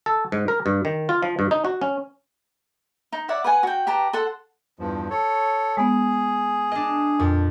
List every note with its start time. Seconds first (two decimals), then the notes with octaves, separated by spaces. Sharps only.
0.06 A4
0.32 G#2
0.48 A#4
0.66 G2
0.85 D#3
1.09 F4
1.23 F3
1.39 G2
1.51 D#4
1.65 F#4
1.81 C#4
3.13 D#4
3.29 C#5 D5 E5 F#5
3.44 B4 F#5 G#5
3.63 F#4 G5
3.87 G4 B4 A5 A#5
4.13 A4 C5 F#5
4.79 E2 G2 F3
5.10 A4 C#5
5.77 G#3 B3 G#4
6.72 D4 D#5
7.19 F2 A#2